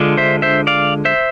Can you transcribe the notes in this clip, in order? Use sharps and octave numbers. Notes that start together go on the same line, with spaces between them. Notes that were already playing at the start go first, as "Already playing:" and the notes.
Already playing: D3 G#3 D4 F4
C5 E5
C5 E5
D5 F5
C5 E5